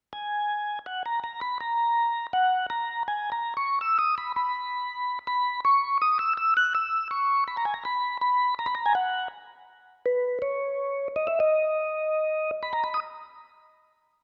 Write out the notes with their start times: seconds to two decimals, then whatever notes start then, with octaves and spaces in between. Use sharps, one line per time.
0.13 G#5
0.86 F#5
1.06 A#5
1.24 A#5
1.41 B5
1.60 A#5
2.33 F#5
2.70 A#5
3.08 G#5
3.32 A#5
3.57 C#6
3.81 E6
3.99 D#6
4.18 B5
4.36 B5
5.27 B5
5.65 C#6
6.02 D#6
6.19 E6
6.37 E6
6.57 F#6
6.75 E6
7.11 C#6
7.48 B5
7.57 A#5
7.65 G#5
7.74 A#5
7.85 B5
8.21 B5
8.59 A#5
8.66 B5
8.75 A#5
8.86 G#5
8.95 F#5
10.06 B4
10.42 C#5
11.16 D#5
11.27 E5
11.40 D#5
12.63 B5
12.73 A#5
12.84 B5
12.94 D#6